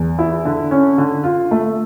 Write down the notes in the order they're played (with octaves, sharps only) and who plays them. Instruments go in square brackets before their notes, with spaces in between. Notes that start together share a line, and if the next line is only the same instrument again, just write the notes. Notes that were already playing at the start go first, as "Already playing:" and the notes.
Already playing: [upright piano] E2
E4
D3
C#4
D3
F4
A3